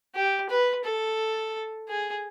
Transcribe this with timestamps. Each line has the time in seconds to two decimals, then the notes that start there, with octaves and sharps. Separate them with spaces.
0.15 G4
0.49 B4
0.85 A4
1.89 G#4